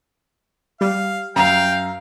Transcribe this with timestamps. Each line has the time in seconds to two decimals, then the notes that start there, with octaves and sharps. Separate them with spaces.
0.81 G3 F5
1.36 F#2 F5 G5 A#5